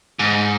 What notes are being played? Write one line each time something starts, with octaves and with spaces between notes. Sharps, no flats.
G#2